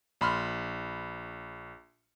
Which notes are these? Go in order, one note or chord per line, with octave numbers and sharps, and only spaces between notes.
A#1 B5 C6 F6